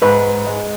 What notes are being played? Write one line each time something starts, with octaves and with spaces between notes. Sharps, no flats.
G#2 B4
G#3